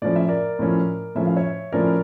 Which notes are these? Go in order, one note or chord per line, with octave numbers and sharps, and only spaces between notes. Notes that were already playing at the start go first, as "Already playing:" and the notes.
A2 F3 C#4 D5
E5
A#4 D5
A2 F3 C#4
A2 F3 C#4 E5
F5
C#5 E5
A2 F3 C#4 A#4 D5